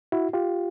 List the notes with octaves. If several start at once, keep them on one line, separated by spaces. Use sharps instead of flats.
E4 F#4
F4 G4